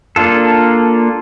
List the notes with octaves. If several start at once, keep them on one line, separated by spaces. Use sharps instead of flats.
A#3 D4 F4 A4